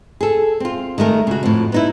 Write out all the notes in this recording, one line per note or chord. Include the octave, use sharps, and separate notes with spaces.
G#4 A4
C4 F4
D#3 G#3 A3 A#4
C#3 F#4
F2 A2
B3 D#4 E4